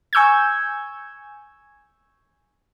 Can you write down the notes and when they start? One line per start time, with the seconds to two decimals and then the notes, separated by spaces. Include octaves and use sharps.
0.13 G#5 C#6 E6 G6 G#6